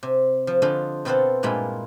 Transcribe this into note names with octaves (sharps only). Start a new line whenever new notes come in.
C3
F3
D3 F4 A4 C5 D#5 B5
B2 C4 F4 A4 C5 F#5
G2 A#2 G#3 E4 F4 B5